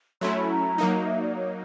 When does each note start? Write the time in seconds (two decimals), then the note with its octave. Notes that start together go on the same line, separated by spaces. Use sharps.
0.21 F#3 A3 C#4 E4 C6
0.36 B5
0.50 A#5
0.78 F#3 A#3 D#4
1.06 E5
1.21 D5
1.35 C#5